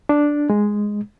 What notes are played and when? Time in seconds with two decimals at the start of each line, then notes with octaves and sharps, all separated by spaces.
0.09 D4
0.50 G#3